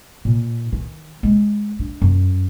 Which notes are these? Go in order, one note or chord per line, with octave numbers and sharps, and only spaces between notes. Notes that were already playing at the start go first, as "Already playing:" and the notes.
A#2
D#3 E3
G#3
D4
F#2